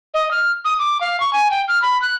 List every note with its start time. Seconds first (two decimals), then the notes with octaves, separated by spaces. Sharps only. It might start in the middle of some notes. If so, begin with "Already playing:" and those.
0.14 D#5
0.31 F6
0.65 D#6
0.79 D6
1.01 F5
1.20 C#6
1.33 G#5
1.51 G5
1.68 F6
1.82 B5
2.02 F#6